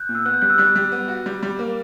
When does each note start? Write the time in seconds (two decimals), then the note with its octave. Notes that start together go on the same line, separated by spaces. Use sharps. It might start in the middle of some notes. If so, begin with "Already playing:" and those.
Already playing: F#6 G6
0.09 A#2
0.15 E6
0.25 B3 F#6
0.34 G6
0.42 G3 F#6
0.50 E6
0.58 G3 F#6
0.76 G3
0.92 B3
1.08 F#4
1.26 G3
1.43 G3
1.59 A#3